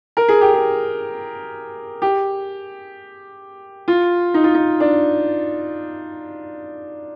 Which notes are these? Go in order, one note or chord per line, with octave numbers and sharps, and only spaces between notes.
A#4
G#4
G4
G#4
G4
F4
D#4
F4
D#4
D4